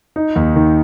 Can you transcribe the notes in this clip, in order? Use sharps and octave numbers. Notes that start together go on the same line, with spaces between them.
D#4
D#2
D#3